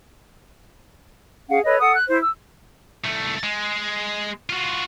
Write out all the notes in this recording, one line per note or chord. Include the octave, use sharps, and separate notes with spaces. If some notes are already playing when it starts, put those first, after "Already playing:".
C#4 G#4 F5 F#5
A4 B4 C#5 D#5
A4 F#5 D#6
F#6
E4 C5
E6
C2 A3
G#3
F4 F#4